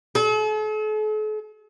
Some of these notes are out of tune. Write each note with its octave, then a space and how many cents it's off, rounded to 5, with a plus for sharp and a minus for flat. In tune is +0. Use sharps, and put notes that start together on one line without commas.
A4 -45